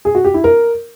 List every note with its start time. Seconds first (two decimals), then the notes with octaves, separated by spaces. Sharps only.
0.05 G#4
0.15 F#4
0.25 G4
0.34 E4
0.44 A#4